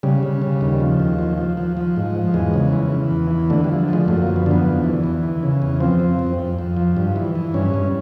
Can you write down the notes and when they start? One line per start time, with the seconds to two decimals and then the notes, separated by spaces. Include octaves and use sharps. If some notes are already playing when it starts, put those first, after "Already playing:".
0.03 C#3 G3
0.23 C#3
0.42 C#3
0.61 D#2
0.80 F3
1.00 D#2
1.19 F3
1.38 F3
1.57 F3
1.77 F3
1.96 G#2
2.15 F3
2.34 E2 G#3
2.54 C#3
2.72 E3
2.92 E3
3.11 E2
3.31 E3
3.50 D3 A3
3.64 G3
3.69 F3
3.88 F3 G#3
4.08 F#2 A3
4.22 A#3
4.27 F3
4.36 B3
4.46 D3 B3
4.66 E2
4.84 E3
5.04 E2
5.23 E3
5.43 C#3
5.62 E2
5.80 F3 C4
6.00 F2
6.19 F2
6.39 F2
6.58 F2
6.77 F3
6.96 G2
7.16 E3
7.35 E3
7.54 G2 C#4
7.74 G2